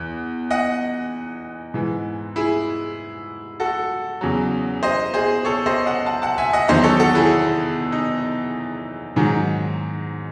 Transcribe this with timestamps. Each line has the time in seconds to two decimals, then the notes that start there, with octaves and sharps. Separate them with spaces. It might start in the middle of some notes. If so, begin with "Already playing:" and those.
Already playing: E2
0.51 D#5 F#5
1.74 G#2 E3
2.36 E4 G#4
3.60 F#4 A4
4.21 E2 C#3 F#3
4.83 C5 D#5
5.14 G#4 C5
5.45 A4 C#5
5.66 C5 D#5
5.86 D#5 F#5
6.06 F#5 A5
6.22 F#5 A5
6.38 E5 G#5
6.53 D#5 F#5
6.68 E2 D#3 F#3 C5 D#5
6.84 A4 C#5
7.00 F#4 A4
7.15 E4 G#4
7.92 D#4
9.16 G#2 D#3 F#3